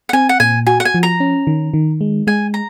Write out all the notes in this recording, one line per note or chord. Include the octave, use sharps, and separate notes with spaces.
F#5
C4 G#5
F#5
A#2 G#5
F#4 G#5
F#5
G#5
F3
A#5
C#4
D#3
D#3
G#3
G#3 G#5
A#5